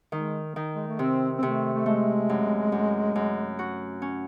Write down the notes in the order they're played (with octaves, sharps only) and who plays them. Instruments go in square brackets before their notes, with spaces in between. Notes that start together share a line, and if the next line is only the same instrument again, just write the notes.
[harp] D#3 [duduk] G#3
[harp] D#3
[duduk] G#3
A3
[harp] C3 [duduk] C4
[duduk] C4
[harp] C3 [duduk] A3
[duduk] A3
[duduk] G#3 [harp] A3
[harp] F#2
F#2
F#2
F#4
C#4